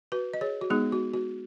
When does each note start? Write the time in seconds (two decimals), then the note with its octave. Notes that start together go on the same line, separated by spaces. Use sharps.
0.12 F#4 B4
0.33 D#5
0.41 G#4 C#5
0.61 F#4
0.70 G#3 B3 D#4 G#4
0.92 F#4
1.14 F#4